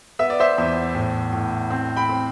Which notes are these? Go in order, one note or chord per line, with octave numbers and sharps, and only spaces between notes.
B3 E5
D5
C5 E5
E2
A2
A2
C4
G5 B5
C4